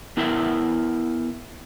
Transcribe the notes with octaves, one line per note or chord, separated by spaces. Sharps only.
B3 E4 A#4 E5 G5